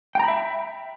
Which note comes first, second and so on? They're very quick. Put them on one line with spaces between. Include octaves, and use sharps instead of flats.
G5 A#5 B5 E5